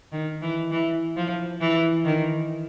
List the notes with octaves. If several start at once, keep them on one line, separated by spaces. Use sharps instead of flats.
D#3
E3
E3
F3
E3
D#3